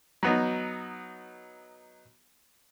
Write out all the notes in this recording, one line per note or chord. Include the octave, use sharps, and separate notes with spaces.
F#3 B3 D#4